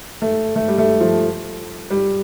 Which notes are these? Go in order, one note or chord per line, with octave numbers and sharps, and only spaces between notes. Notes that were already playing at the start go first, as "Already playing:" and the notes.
A3
A3
G3
A3
F3
G3